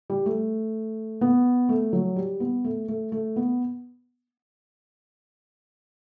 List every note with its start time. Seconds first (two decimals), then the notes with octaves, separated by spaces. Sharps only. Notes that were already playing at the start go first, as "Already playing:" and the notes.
0.10 G3
0.26 A3
1.21 B3
1.69 A3
1.93 F#3
2.16 G3
2.40 B3
2.64 A3
2.88 A3
3.12 A3
3.36 B3